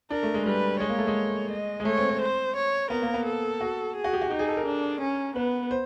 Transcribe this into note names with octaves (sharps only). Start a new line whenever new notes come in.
D4 A#4
A3
G#3
G3 B4
G#3 C#5
A#3
A3
G#3
D#5
G#3
A3 C#5
C4
C4
C5
C#5
B3 A#4
A#3
B3
A4
F#4
G#4
F#4
G4
F#4
D#4 G4
G#4
A4
A#4
D4
C#4
B3 B4
C5